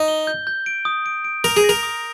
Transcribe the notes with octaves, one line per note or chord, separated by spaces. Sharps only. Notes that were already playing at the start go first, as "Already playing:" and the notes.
Already playing: D#4
G7
G6
G6
D7
D#6
D7
D7
A#4 D#6
G#4
A#6
A#4
D#6